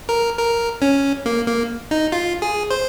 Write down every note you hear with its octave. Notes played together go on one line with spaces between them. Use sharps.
A#4
A#4
C#4
A#3
A#3
D#4
F4
G#4
C5